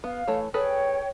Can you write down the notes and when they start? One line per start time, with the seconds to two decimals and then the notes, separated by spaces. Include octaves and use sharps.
0.04 B3 F5
0.27 E3 A3 C#5
0.54 G#4 A4 B4 C#5 G5